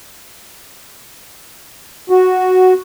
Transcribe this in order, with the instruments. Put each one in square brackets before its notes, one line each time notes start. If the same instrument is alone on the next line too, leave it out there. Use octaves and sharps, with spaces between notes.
[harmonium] F#4